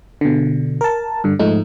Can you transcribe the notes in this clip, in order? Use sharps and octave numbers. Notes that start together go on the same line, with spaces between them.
B2 D3
A#4 A5
G2 D3
G#2 F3 A3 D#4